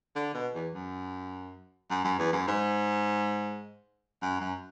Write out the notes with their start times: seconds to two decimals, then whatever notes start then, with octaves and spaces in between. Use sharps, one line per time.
0.16 D3
0.34 B2
0.54 E2
0.74 F#2
1.90 F#2
2.04 F#2
2.18 E2
2.32 F#2
2.47 G#2
4.22 F#2
4.40 F#2